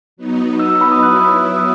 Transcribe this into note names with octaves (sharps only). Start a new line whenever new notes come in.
F#3 B3 D#4
E6
E6
B5
D#6
F#3 B3 E4 F#6
E6
D#6